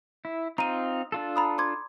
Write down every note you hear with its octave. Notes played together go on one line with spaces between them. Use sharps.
E4
C4 D#4 F4 A#5 D#7
D4 F4 A4
A#5 B5 D#6
C6 D6 G#6